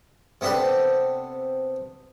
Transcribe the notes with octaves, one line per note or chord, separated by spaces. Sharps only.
C3 B3 D4 G4 A4